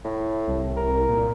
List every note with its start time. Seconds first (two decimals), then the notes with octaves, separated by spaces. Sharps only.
0.05 A2
0.47 C2
0.77 A#4
1.09 A#2